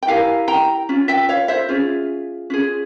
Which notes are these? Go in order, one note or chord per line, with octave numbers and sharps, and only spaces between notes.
G5
E4 G4 A#4 F5 G#5
G5 A#5
C#4 F4
E5 G5
C#5 F5
C5 E5
C#4 F4 G#4
C#4 F4 G#4